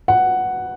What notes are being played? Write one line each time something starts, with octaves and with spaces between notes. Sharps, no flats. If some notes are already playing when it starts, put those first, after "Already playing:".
F#5